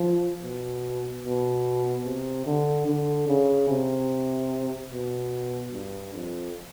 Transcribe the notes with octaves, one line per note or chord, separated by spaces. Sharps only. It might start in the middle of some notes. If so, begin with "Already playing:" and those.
Already playing: F3
B2
B2
C3
D3
D3
C#3
C3
B2
G2
F2